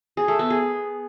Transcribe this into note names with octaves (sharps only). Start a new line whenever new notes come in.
G#4
A3
B3
G#4